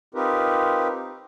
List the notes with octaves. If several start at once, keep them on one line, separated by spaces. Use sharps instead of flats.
C4 D#4 F4 G4 A#4 B4